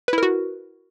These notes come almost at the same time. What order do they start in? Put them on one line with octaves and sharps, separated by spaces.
B4 E4 A#4 F#4